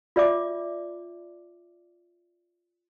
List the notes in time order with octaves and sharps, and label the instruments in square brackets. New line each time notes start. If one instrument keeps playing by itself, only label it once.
[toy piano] F4 D5 E5 D6